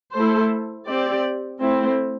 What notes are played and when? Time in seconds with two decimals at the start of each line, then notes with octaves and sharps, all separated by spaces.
0.15 A3 E4 A4 C5
0.88 C4 G4 D5
1.61 A3 C4 E4